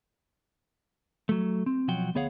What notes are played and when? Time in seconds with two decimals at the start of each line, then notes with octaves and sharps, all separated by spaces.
1.29 F#3 A3
1.66 C4
1.88 B1 F3 F#3 F#4 G5
2.15 D2 B3 G#4 C#5 F5 F#5